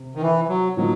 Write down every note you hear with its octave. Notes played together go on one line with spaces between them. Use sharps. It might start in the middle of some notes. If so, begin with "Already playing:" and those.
Already playing: C3
D#3
E3
F#3
A2 F3 F#3 A#3 D#4